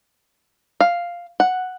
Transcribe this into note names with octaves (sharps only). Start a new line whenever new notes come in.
F5
F#5